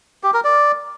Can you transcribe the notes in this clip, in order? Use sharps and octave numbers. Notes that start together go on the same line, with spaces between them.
G4
A#4
D5